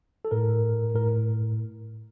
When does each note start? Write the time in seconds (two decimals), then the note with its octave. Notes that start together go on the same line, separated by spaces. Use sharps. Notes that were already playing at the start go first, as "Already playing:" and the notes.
0.25 A4
0.31 A2 A#4
0.95 A2 A#4